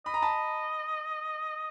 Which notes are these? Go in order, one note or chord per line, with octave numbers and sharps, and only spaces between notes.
D#5 B5
A#5
A5 B5